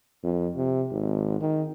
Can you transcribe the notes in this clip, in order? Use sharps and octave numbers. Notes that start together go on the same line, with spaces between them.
F2
C3
G#1
D#3